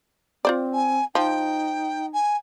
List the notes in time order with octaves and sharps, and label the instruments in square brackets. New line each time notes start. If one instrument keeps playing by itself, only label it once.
[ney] C4 [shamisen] F4 C5 D5
[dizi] G#5
[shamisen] F3 [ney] D#4 [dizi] G5
[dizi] G#5